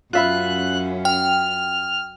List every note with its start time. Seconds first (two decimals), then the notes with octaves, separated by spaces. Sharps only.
0.13 F#2 C#4 F4 E5 B5 F#6
1.05 G5 F6